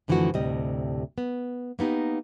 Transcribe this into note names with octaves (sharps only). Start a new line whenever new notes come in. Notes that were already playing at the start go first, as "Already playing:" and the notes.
F#2 D3 E3 F3 A3 F#4
D2 A2 C3 G3 D#5
B3
A#3 B3 D#4 G4